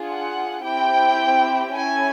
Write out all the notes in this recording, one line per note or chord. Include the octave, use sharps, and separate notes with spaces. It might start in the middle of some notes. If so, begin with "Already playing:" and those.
Already playing: D4 F4 G#4
F#5
C4 E4 G4 G5
C#4 E4 A4 G#5